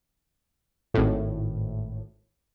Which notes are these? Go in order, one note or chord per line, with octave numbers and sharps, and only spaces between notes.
G#1 A2